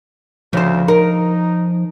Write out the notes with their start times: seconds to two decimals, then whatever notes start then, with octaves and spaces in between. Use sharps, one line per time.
0.53 D2 C#3 F3 C5
0.88 D#4 A#4